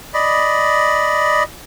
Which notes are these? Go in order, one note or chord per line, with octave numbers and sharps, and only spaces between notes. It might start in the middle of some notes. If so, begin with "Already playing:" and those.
D5 D#5 B5